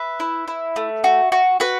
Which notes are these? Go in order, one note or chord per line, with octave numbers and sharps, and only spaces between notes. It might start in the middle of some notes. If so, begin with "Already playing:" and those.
Already playing: B4 E5
E4
E4
A3
F#4
F#4
F#4 B4